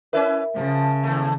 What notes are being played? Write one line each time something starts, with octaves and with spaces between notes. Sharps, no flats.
C#4 E4 A#4 B4 E5
C#3 F3
D#2 A3